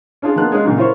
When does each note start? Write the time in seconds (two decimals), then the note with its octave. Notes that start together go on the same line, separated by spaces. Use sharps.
0.22 C#4 D4 F4 G#4
0.36 D#3 A#3 B3 F4 A5 F#6
0.52 G#3 C#4 F4 D#5 F#6
0.64 A#2 C#3 F#3 D#4
0.77 E4 F4 A#4 C5 C#5 C#6